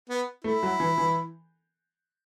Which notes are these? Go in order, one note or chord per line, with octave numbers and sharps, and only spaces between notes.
B3
A3 E4
F#3
E3
E3